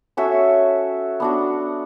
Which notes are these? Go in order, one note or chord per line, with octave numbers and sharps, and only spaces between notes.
C#4 F#4 A4 E5
B3 D4 F#4